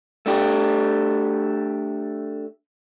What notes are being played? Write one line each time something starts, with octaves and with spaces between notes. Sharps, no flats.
A3 D4 G4